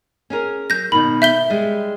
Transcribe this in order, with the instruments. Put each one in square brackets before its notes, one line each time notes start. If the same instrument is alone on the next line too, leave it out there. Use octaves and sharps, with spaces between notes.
[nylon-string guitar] C#4 G#4 A#4
[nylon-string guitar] F#3 [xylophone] G6 A#6
[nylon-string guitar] B2 D#3 [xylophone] B5
[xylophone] E5 G6 G7
[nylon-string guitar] G3 G#3